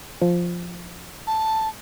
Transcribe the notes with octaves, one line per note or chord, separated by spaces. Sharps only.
F3
A5